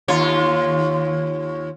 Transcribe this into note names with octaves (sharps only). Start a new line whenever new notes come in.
D#2 F4 C#5